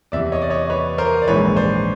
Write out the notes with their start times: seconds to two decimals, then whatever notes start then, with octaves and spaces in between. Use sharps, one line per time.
0.12 E2 C3 E3 D5 E5
0.32 C#5 D#5
0.42 D5
0.50 C#5 D#5
0.70 B4 C#5
0.98 A#4 C5
1.22 D5
1.28 A#1 G#2 E3 G#3 B4 C#5
1.56 C5 D5